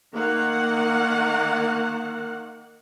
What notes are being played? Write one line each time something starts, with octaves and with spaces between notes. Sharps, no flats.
D#3 A#3 F#5